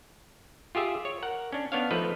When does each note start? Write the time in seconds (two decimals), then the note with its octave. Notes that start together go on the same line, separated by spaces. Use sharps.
0.75 F4 G4 G#4 E5
1.05 C#5
1.22 A#4 F#5
1.52 C#4 D4
1.72 B3 D4 C#5 F5
1.91 F3 A3 D#4 B4